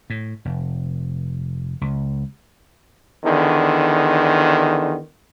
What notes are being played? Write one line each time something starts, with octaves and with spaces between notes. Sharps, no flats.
A2
F1
C#2
E2 D3 D#3